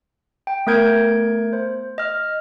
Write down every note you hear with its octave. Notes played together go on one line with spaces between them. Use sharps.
G5
A3 B3 A#4 G6 G#6 D7
C5
D#5 F6